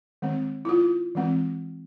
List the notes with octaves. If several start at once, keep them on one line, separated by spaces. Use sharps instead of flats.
D#3 G#3 C4
E4
F4
E3 G#3 C4